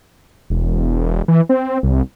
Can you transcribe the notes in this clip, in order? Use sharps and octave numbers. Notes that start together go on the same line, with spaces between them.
E1
E3
C4
C2